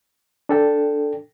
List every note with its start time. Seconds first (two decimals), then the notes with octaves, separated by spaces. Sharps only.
0.49 D4 A4 G5